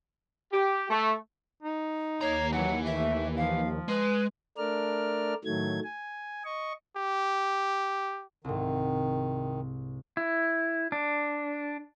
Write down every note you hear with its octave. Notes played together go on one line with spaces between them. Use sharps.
G4
A3
D#4
D#2 A#3 C#5 A#5
E3 F#3 F#5
A3 E5
F3 F5
G#3 B4
A3 D4 A#4 D5 F6
A2 D#3 F#3 A3 G#6
G#5
D#5 C#6
G4
C2 G#2 D#3
E4
D4